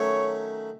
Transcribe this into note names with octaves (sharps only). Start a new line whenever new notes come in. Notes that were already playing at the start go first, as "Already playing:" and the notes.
Already playing: D#3 F#3 A3 C#4 C#5